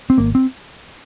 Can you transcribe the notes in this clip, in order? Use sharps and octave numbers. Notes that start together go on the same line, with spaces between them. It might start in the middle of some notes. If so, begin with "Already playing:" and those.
C4
G#1 A#3
C4